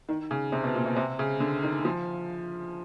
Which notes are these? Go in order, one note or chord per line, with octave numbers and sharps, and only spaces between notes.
D#3
C#3
C3
B2
A#2
B2
C3
C#3
D3
D#3
F3